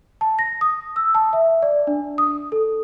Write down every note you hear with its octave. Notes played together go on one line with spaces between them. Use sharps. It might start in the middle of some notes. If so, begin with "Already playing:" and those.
A5
A#6
D#6
E6
A5
E5
D5
D4
D#6
A4